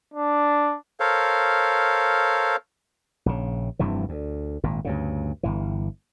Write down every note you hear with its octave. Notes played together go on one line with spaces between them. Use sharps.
D4
A4 A#4 C5 C#5 F5
A#1 C#3
F1 G2 C3 E3
D2
G#1 A#2
D2 G2 C#3
G1 C#2 E3